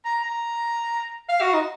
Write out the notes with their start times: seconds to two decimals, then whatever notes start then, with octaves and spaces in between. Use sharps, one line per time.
0.05 A#5
0.23 A#5
1.29 F5
1.41 F#4
1.54 D#4